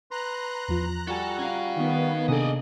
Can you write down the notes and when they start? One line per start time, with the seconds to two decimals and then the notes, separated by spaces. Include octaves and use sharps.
0.11 B4 A#5 C6 F#6
0.68 E2 F3 F4
1.07 G3 F4 F#4 A4 G#5
1.39 C#4 F5
1.76 D#3 B3
2.28 C3 A#3 D4 G#4 A4 D5 D#5